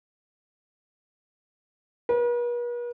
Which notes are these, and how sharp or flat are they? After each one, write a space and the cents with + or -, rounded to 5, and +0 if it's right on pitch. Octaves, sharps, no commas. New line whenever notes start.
B4 -45